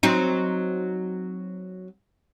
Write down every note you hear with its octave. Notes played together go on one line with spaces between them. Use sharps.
F#3 C4 D#4